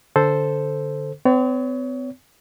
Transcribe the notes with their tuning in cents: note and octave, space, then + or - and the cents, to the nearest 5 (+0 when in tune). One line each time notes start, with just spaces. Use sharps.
D3 +0 A4 +0 C5 +0
C4 -45 C#5 +30